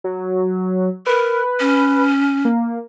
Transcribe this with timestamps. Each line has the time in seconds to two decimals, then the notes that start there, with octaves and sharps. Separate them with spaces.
0.04 F#3
1.07 A#4 B4
1.60 C#4
2.45 A#3